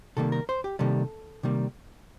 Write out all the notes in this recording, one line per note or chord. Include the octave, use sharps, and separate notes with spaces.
C3 D#3 G3 A#3 A4
A#4
C5
G4
C3 D#3 G3 A#3 A4
C3 D#3 G3 A#3